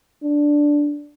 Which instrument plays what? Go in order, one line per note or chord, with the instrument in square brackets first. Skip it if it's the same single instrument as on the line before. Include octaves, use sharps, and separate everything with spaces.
[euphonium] D4